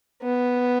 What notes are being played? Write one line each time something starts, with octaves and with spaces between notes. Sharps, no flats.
B3